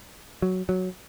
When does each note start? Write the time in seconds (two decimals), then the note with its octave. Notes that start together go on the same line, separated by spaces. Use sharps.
0.42 F#3
0.69 F#3